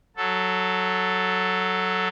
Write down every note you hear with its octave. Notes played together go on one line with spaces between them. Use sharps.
F#3 A4